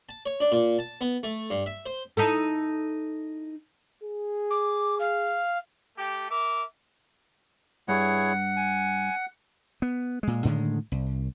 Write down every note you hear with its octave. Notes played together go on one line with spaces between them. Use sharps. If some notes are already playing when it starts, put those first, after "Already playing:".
A5
C#5
D4
A#2
A5
B3
A3
G2
E5
C5
D#4 E4 A4
G#4
D6
F5
A3 G4
A#4 E5 D6
G2 E4 G#4 C#5 F#5
G#5
B3
A#2 G#3
A2 D3 D#3 G#3
C2